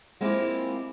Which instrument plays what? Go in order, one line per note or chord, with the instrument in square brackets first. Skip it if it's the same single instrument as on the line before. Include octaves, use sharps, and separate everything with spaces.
[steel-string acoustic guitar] G#3 A#3 C4 E4 F4 G4